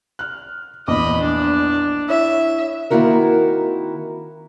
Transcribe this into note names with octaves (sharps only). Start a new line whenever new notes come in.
F6 F#6
A#1 E2 D#5 B5 D6
D4
E4 C#5 E5
D#3 A#3 C4 E4 F#4 A#4